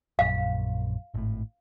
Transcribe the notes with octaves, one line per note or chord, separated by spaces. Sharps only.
A#1 F#2 F5
G#1 A2